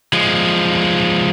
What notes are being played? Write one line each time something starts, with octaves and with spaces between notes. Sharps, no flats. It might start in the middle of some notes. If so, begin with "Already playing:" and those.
F3 G#3